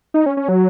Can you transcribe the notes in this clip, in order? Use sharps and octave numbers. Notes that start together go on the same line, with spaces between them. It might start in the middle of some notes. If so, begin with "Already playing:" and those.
D#4
C#4
C#4
F#3